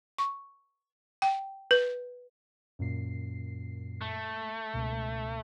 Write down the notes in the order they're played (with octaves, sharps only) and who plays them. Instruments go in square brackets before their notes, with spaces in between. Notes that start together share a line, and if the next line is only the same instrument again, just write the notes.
[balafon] C#6
G5
B4
[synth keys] F#2 A#2 C7
[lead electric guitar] A3
[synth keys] C#2 B2